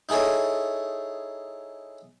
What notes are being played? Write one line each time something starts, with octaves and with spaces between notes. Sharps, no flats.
D#4 E4 G#4 A4 C#5